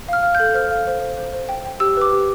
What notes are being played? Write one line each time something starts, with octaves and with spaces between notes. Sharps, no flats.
F5 F6
F5
A4 G6
C5 F6
F5
C5
C5
C5
C5
G5
G5
G4 E6
B4 D6
G4